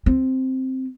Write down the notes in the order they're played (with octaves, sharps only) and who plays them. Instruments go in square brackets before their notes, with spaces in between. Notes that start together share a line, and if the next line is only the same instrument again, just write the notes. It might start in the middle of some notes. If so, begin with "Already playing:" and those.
[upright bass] C4